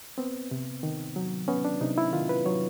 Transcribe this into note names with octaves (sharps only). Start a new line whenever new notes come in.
B3 C4
C3
D#3
F#3
B3 C#4
D4
C3 D#4
E4
D#3 F4
B4
F#3 C#5